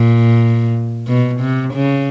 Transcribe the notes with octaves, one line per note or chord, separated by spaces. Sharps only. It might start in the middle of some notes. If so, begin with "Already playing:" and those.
Already playing: A#2
B2
C3
C#3